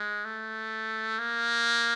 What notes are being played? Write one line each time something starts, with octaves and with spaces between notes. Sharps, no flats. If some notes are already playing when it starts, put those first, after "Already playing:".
Already playing: G#3
A3
A#3